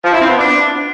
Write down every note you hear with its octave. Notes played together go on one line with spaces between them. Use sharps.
F3
E4
C4
B3
D4